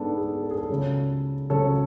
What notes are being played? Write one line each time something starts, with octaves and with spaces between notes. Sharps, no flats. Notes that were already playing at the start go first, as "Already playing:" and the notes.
Already playing: G#2 G#3 B3 D4 A4 D5
G#4
A4
G#4
A4
C#2 C#3 F#3 C#4
C#2 C#3 F#3 C#4 A4 C#5